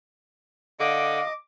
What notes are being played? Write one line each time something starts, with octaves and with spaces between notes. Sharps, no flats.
D3 D#5 F5 D6